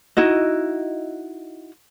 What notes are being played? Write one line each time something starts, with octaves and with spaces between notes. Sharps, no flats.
D#4 E4 F#4 D#5